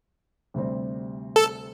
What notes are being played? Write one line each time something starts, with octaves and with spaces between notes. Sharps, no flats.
D2 C3 G3 C4
A4